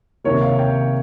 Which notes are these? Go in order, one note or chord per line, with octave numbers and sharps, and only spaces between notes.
C3 D#3 A#3 C#5
F5
G5